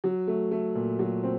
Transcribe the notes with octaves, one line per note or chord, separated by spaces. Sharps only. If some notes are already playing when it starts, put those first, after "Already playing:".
F#3
A3
A3
A#2
F#3
C4